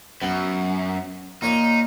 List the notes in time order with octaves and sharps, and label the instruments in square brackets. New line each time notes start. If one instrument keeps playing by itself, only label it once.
[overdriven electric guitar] F#2 [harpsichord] B3
[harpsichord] A#2 C#5 [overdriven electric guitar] D#4